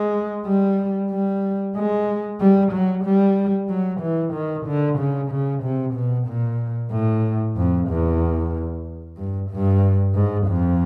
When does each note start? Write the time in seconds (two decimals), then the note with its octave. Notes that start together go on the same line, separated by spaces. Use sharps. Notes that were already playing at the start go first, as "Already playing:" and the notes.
Already playing: G#3
0.46 G3
1.11 G3
1.76 G#3
2.40 G3
2.72 F#3
3.05 G3
3.69 F#3
4.01 E3
4.33 D#3
4.66 D3
4.98 C#3
5.31 C#3
5.63 C3
5.94 B2
6.28 A#2
6.91 A2
7.56 F2
7.89 E2
9.17 G2
9.50 G2
10.14 G#2
10.47 F2